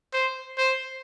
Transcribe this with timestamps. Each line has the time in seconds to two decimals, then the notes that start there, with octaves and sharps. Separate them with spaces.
0.13 C5
0.58 C5